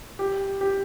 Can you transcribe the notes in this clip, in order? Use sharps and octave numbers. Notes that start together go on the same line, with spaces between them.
G4
G4